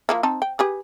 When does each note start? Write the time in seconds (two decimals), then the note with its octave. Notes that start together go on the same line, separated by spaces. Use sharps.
0.09 F3 A#3 E4
0.23 C4 D#4 A5
0.42 G5
0.59 G4 G#4 B4